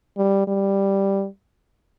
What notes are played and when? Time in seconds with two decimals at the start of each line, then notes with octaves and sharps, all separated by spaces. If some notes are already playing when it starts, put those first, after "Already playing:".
0.18 G3
0.47 G3